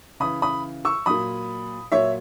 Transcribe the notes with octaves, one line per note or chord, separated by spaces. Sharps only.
C#3 E3 B5 D#6
B5 D#6
C#6 E6
A#2 F#3 B5 D#6
A#2 F#3 C#5 E5